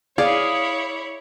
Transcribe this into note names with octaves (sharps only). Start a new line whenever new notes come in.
E4 G#4 C#5 D5 F5 D6